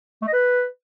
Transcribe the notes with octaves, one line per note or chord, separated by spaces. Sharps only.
A3
D#5
B4